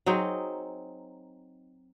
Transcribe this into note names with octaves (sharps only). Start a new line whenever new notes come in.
F#3 C4 D#4 G#4